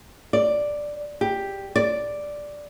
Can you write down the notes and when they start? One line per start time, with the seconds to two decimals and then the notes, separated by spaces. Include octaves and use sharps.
0.33 D5
1.21 G4
1.76 D5